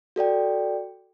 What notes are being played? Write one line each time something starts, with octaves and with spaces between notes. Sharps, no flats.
F#4 A4 D5 G5